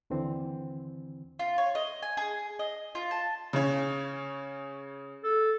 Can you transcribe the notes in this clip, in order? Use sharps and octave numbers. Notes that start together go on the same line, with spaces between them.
D#2 D3 E3 C4
F4
C#5
D#5
G#5
G#4
D#5
F4
A5
C#3 C#4
A4